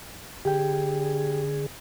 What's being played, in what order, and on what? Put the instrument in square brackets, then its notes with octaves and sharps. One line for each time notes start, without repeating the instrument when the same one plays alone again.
[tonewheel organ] D3 G#4 [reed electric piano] G4 G5